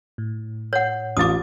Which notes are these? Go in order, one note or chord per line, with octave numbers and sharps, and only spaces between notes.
A2
C#5 F#5
A1 F4 D6 D#6 A6